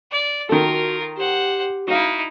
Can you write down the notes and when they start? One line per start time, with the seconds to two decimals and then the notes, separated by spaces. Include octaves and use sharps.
0.12 D5
0.49 D#3 F4 F#4 A4 A#4
1.17 G4 C5 F#5
1.88 D#4 E4 F#4 F5